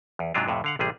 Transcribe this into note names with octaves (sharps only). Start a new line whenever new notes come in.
E2
G#2 C3 F#3 D4 F4
F2 A2 C3
D3 F5 F#5
A1 C3 G3 G#4